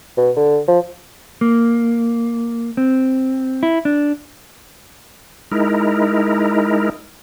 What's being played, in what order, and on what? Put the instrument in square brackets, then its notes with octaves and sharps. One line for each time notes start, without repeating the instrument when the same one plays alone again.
[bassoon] B2
D3
F3
[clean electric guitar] A#3
C4
E4
D4
[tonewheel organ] G#3 D#4 E4 A#4